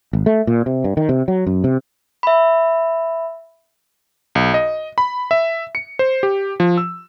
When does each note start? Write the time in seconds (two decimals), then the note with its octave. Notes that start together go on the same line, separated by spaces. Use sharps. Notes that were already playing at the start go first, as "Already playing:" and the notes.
0.13 G#1
0.26 A3
0.47 A#2
0.66 C3
0.84 G2
0.97 D#3
1.09 C3
1.28 F#3
1.46 F#2
1.64 C3
2.23 E5 B5
4.35 B1
4.54 D#5
4.98 B5
5.31 E5
5.75 C#7
5.99 C5
6.23 G4
6.60 F3
6.78 E6